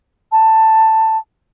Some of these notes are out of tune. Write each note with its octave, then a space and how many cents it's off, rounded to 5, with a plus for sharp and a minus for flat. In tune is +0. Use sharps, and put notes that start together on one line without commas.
A5 +10